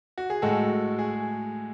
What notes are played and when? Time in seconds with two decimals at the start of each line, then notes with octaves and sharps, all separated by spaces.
0.18 F#4
0.30 G#4
0.42 A2 G#3 F#4 A4
0.99 G#4